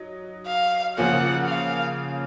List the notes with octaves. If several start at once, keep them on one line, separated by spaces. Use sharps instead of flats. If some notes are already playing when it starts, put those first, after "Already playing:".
Already playing: F#3 D#4
F5
C#3 F3 A#3 C#4 F4 F#5
F5